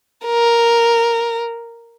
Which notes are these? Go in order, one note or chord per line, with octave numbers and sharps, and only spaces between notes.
A#4